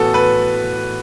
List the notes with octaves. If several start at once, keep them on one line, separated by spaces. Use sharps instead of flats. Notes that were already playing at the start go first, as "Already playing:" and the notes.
Already playing: A2 E3 B3 F#4 A4
B4